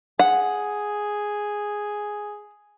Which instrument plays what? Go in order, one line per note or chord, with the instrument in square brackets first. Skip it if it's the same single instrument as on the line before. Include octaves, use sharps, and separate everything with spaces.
[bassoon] G#4 [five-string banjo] F#5